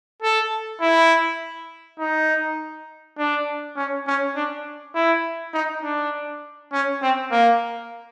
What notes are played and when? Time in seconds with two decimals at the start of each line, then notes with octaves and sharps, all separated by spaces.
0.22 A4
0.81 E4
1.99 D#4
3.18 D4
3.76 C#4
4.07 C#4
4.35 D4
4.95 E4
5.53 D#4
5.83 D4
6.72 C#4
7.02 C4
7.32 A#3